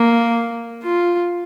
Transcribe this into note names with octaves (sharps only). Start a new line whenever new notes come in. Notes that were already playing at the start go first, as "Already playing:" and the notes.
Already playing: A#3
F4